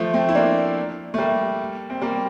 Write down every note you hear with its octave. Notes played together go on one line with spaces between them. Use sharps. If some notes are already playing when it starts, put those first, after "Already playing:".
Already playing: F3 A3
A3 C4
E4
A#3 D4
A3
G3 A#3
C4
G3 A#3